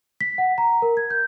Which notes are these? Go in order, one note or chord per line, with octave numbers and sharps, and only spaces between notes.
B6
F#5
A#5
A#4
G#6
G6